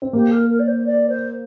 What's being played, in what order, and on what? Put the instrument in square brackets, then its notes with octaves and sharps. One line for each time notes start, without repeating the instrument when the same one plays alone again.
[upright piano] C4
[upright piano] A#3 [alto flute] G4
[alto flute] A#4
A#4
D5
C5
D5
C5